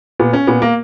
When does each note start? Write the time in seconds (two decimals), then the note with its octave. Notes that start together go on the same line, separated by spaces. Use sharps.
0.20 A#2 B3
0.33 C#4
0.47 A#2 B3
0.62 A#3